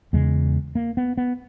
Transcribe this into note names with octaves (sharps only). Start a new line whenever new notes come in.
E2 C#3 G#3
A#3
B3
B3